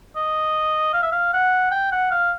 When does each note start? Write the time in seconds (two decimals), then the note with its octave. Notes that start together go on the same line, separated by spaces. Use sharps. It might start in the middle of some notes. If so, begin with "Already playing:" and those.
0.16 D#5
0.93 F5
1.03 E5
1.12 F5
1.33 F#5
1.72 G5
1.92 F#5
2.11 F5